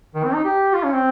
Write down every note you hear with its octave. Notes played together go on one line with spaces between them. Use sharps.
D#3
C4
D#4
G4
F4
C#4
C4